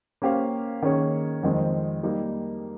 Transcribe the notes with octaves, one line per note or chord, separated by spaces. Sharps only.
A#3 C#4 G4 C5 F5
D#3 A#3 C#4 G#4 C#5
F2 D#3 G#3 C4
G3 A#3 D#4